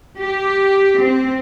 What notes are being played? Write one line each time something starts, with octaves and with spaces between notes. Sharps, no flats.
G4
C4